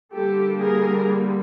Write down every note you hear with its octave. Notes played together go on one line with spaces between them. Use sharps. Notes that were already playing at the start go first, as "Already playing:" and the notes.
D3 G3 A#3 G4 A4
G#4 A#4